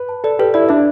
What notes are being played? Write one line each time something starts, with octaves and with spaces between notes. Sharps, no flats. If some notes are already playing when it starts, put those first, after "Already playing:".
Already playing: B4
A5
A4 D5
G4 B4
E4 D5
D4 E5